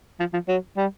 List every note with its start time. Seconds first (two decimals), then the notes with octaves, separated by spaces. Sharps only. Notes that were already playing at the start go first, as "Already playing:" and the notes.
0.20 F3
0.33 F3
0.48 F#3
0.77 G3